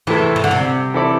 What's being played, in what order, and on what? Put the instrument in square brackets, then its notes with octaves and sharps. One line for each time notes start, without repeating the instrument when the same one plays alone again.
[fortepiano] E2 C3 A3 E4 [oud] E3
[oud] E3
D3
C3
[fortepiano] E3 C4 E4 A4 D5